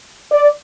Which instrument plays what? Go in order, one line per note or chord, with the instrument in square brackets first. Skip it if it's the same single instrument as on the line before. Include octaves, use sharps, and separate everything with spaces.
[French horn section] D5